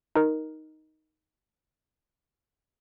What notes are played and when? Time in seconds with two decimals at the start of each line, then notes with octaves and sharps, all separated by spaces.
0.16 D#4 A#4